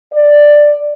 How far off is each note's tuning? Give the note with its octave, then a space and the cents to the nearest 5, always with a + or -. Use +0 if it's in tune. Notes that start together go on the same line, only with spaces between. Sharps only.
D5 +5